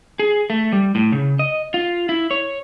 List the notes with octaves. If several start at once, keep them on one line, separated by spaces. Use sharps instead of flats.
G#4
A3
G3
A2
C#3
D#5
F4
E4
C#5